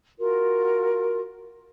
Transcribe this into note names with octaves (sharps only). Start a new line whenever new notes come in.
F4 F#4 A#4